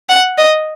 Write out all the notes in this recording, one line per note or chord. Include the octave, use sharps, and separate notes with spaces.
F#5
D#5